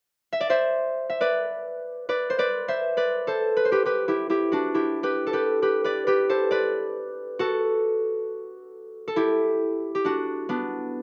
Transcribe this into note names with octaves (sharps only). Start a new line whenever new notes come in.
E5
D5
C5 E5
E5
B4 D5
B4 D5
C5
B4 D5
C5 E5
B4 D5
A4 C5
B4
C5
G4 B4
G4 B4
E4 G4
E4 G4
D4 F#4
E4 G4
G4 B4
A4
G4 B4
G4 B4
B4 D5
G4 B4
A4 C5
B4 D5
F#4 A4
A4
E4 G4
G4
D4 F#4
B3 D4